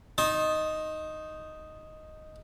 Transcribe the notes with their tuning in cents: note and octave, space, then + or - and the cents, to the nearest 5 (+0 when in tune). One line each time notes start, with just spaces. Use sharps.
D#4 +0 A5 -20 C6 +45